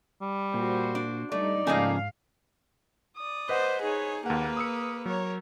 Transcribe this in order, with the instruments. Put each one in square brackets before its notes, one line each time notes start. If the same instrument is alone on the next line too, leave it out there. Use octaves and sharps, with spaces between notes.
[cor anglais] G3
[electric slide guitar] A#2 [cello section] F#4 C5
[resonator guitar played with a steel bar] D4
[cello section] G3 D#4 [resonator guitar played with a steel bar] A3 [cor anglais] D5
[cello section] G#2 F5 [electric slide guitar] C#3 F3 G#5 [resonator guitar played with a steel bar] A3 A#3 D#4
[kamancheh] D5 D#6
[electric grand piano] B4 D#5 F#5 [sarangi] C5
[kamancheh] D#4 C#5 [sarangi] G#4
[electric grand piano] D#2 F#5 [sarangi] A#3 [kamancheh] B4
[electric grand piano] D#6 E6 C#7
[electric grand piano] F#3 [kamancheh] A#4 C#5